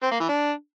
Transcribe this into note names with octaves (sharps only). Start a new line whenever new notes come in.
C4
A#3
E3
D4